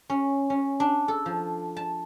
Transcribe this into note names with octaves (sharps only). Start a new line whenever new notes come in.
C#4
C#4
D4
A4
F3
A5